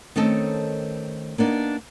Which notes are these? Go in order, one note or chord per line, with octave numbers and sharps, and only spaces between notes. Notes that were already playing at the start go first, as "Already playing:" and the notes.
D#3 A3 C4 C#4 A4 D#5
A#3 B3 D4 D#4